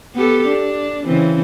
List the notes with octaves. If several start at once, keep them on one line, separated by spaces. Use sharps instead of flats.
B3 G4 A4
D4
C#3 E3 C4